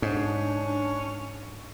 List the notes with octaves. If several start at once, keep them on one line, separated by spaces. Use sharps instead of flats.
G#2 C#4 D4